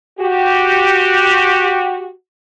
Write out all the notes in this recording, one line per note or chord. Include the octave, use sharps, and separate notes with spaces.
F#4 G4